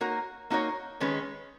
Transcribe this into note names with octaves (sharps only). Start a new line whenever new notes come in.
A#3 D#4 F#4 A#4 C#5
A#3 D#4 F#4 A#4 C#5
D#3 G#3 C#4 G#4 B4